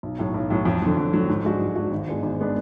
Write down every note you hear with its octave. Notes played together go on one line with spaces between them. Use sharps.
B1
A2 F#3
B1
A2 F#3
F2
D3 F#3
F2
D3 F#3
G#2
G#3 D4 F#4
G#2
G#3 D4 F#4
G#1
G#2 G#3 B3 D4
G#1
G#3 B3 D4